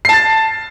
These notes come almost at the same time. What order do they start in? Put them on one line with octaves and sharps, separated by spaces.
C7 A5 A6